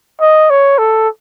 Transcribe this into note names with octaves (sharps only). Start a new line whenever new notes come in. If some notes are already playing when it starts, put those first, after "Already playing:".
D#5
C#5
A4